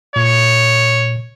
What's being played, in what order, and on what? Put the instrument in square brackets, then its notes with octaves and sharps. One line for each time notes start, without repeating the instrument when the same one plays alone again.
[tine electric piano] A#2 C#7 [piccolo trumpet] C#5